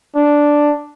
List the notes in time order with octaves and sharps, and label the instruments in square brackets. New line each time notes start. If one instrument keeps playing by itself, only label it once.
[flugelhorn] D4